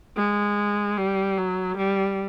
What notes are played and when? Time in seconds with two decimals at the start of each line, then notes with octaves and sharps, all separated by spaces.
0.16 G#3
0.97 G3
1.37 F#3
1.77 G3